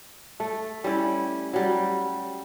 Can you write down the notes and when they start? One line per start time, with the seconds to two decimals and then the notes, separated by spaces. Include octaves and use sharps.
0.40 A3
0.84 G3 C#4 E4
1.53 F#3 G3